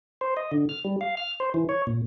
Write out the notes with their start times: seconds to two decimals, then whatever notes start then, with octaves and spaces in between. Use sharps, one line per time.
0.21 C5
0.37 D#5
0.52 D3
0.69 F6
0.84 G3
1.01 F5
1.17 F6
1.40 C5
1.54 E3
1.69 C#5
1.87 A#2